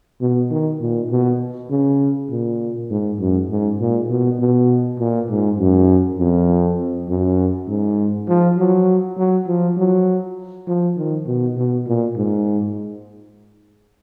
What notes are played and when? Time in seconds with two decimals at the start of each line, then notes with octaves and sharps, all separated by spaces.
0.21 B2
0.51 D#3
0.80 A#2
1.10 B2
1.70 C#3
2.30 A#2
2.90 G#2
3.20 F#2
3.50 G#2
3.79 A#2
4.09 B2
4.39 B2
4.99 A#2
5.29 G#2
5.59 F#2
6.18 F2
7.08 F#2
7.68 G#2
8.28 F3
8.58 F#3
9.18 F#3
9.47 F3
9.77 F#3
10.67 F3
10.97 D#3
11.26 B2
11.57 B2
11.86 A#2
12.16 G#2